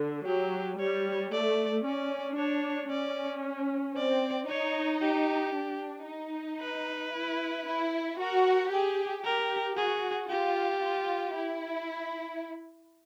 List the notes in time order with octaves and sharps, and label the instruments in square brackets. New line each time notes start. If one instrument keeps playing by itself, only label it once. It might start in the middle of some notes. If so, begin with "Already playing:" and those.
Already playing: [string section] D3
[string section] F#3 [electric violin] G4
[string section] G3 [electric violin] C#5
[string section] A3 [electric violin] D5
[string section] C#4 [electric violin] D5
[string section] D4 [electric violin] C#5
[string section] C#4 [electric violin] D5
[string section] C4 [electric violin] D5
[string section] D#4 [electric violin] C#5
[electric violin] G4
[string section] D4
D#4
[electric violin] B4
[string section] E4
E4
[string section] F#4 [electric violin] A#4
[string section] G4 [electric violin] G#4
[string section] G4 [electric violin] A#4
[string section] F#4 [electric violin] G#4
[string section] F4 [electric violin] G4
[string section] F4
E4